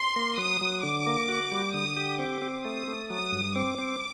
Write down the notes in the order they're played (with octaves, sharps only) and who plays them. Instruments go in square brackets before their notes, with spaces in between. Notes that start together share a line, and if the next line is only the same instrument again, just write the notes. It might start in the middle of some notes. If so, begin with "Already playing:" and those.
Already playing: [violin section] C6
[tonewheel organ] A#3
[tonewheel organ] F#3 [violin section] D#6
[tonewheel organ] F#3
[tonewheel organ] D3 [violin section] D6
[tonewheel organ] A#3
F#4
G3
[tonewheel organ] D3 [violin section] D#6
[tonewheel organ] G4
[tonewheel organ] C4 [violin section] D6
[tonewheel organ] C4
[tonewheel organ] A3 [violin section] D#6
[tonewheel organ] A3
[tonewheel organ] F#3 [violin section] D#6
[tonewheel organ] G2
[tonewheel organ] C4 [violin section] D6
[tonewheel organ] C4